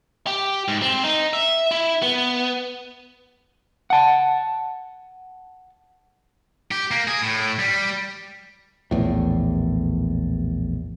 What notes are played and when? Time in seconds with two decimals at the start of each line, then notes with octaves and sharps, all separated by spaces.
0.27 G4
0.68 G#2
0.82 C4
1.04 D#4
1.33 E5
1.71 E4
2.02 B3
3.90 F#5 A5
6.71 G4
6.91 A#3
7.08 G#4
7.22 A2
7.59 G3
8.91 A#1 E2 A2